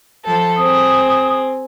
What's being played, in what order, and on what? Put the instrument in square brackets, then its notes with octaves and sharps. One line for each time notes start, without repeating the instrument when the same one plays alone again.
[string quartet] F3 A4
[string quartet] C4 G#4 [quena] D#6